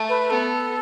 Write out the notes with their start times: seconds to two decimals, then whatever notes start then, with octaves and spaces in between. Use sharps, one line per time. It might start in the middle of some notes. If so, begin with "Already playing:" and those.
Already playing: A3
0.09 B4
0.30 B3 A4